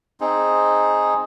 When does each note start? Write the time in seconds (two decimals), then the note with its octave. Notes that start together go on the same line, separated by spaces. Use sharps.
0.21 C4 D#4 G#4